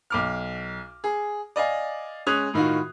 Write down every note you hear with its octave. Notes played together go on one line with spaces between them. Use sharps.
B1 D6 F6
G#4
D5 D#5 F5 G#5
G#3 C#4 D#6 F#6 G#6 F7
A2 D#3 D#4 F4 F#4